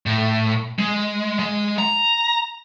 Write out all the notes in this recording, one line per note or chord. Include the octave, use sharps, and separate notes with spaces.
A2
G#3
G#3
A#5